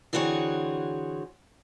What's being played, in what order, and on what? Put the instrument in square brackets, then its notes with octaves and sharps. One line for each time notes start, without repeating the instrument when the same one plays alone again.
[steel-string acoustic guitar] D3 E3 C4 F#4 G#4 C#5